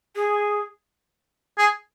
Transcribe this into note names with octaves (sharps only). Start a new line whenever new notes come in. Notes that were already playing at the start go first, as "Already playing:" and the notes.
G#4
G#4